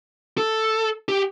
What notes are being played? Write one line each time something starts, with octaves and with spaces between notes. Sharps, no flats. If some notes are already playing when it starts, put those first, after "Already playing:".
A4
G4